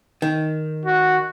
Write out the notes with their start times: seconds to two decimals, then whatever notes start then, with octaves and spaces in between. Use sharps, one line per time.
0.22 D#3
0.86 F#4